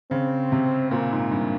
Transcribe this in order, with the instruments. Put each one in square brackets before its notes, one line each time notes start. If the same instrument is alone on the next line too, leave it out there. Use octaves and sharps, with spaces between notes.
[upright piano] C#3 [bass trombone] C4
[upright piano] C3
[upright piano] A#2 [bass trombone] A#3
[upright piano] G#2
G2